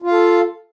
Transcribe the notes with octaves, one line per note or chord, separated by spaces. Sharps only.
F4 A4 F5